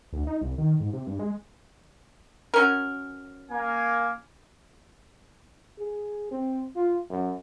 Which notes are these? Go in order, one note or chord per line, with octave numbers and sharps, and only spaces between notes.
D2
D#4
C2
D#3
G#2
C3
G2
G#3
F#3 C#4 A#4
A#3 G#5
G#4
C4
F4
F#2